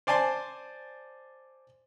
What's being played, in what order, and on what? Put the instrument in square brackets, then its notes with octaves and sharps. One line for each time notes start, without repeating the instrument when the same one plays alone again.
[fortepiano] C5 D5 G#5 A5 C6